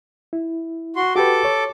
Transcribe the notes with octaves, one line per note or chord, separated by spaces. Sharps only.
E4
F#4 C6
F#4 G4 A4 B4 D6
C#5